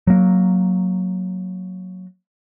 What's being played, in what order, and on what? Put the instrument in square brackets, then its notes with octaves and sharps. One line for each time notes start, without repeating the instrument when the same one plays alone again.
[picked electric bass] F#3 A#3